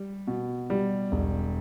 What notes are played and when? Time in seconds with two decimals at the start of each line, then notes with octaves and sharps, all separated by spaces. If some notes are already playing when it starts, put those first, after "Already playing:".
Already playing: G3
0.27 B2
0.70 G3
1.12 E1